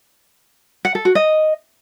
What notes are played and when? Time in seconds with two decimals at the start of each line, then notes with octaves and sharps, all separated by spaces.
0.85 F#5
0.95 A4
1.05 F#4
1.15 D#5